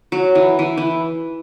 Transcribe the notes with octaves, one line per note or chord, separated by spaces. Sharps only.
F#3
E3
E3
E3